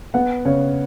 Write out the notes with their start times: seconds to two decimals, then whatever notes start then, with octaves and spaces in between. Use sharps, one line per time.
0.14 B3 F#5
0.45 C#3 C#5